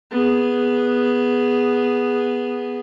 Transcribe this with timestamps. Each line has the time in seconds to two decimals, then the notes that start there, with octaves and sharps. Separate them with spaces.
0.11 B3 G#4